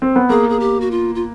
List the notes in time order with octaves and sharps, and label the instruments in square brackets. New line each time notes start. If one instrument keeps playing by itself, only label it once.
[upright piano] C4
B3
[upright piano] A#3 [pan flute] G#4
[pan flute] G#4
G4
F#4
F4
F4